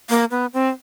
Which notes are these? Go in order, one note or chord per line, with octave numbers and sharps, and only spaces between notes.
A#3
B3
C4